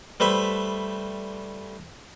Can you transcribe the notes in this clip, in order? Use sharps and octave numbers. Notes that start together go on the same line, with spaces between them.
G3 A3 B4 C5 E5